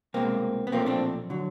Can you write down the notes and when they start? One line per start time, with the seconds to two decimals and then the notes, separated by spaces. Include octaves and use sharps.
0.14 C2 B2 G#3 A#3 C4
0.67 B3
0.72 B1 A#2 F3 A3 A#3 C4
0.86 C4 D4
1.30 D3 F#3